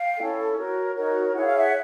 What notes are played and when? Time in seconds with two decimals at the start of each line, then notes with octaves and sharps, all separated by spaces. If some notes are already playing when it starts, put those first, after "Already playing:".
Already playing: F5 G5
0.17 C#4 E4 A4
0.57 F#4 A#4 C#5
0.95 D#4 F#4 A#4 C#5
1.34 E4 G#4 C#5 F#5
1.45 F5
1.57 E5 F#5